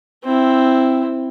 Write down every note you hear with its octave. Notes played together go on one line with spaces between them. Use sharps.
C4 E4